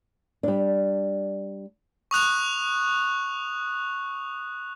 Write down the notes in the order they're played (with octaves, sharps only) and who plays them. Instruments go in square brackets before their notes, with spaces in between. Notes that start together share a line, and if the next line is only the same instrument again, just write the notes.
[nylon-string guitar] G3 D4
[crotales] C#6 D#6 F#6 F7